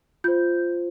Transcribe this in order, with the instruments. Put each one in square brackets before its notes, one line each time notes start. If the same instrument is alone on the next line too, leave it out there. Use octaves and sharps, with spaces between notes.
[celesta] F4 C5 G6